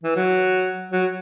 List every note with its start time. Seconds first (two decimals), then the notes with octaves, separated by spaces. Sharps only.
0.03 E3
0.15 F#3
0.91 F#3